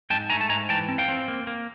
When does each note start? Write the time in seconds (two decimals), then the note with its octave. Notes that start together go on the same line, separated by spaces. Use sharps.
0.10 G#2 G5 A5
0.30 A3 G#5 A#5
0.41 A5
0.49 G#2 G#5 A#5
0.69 E3 G5 A5
0.89 C4
0.98 F5 G5
1.08 C4
1.28 A#3
1.47 A#3